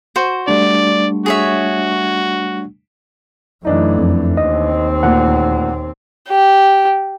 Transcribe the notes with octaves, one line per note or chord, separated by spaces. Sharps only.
F#4 C5
G3 A3 D4 D5
F#4 G#4 C#5 E5
F#2 E3 A3 D4 D#4
F2
D#2 C4 D#5
D2 A#2 F#5
G4